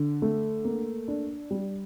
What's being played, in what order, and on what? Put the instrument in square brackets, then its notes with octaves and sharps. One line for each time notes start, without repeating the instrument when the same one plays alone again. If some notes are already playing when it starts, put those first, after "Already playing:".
Already playing: [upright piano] D3
A3
A#3
D4
G3